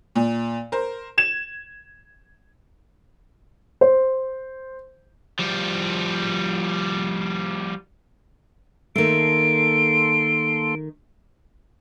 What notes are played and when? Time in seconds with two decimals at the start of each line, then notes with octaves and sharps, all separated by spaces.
0.15 A#2
0.72 A#4 C5
1.18 G#6 E7
3.81 C5
5.39 F3 G3
8.96 D#3 A3 A#3 A4 C6 D7